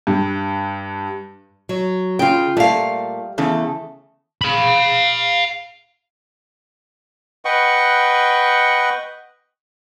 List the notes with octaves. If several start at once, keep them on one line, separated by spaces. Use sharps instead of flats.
G2
F#3
C#3 F4 G5
A#2 G3 A3 F5
E2 C#3 A3
F5 B5
B4 D#5 F#5 G5 C#6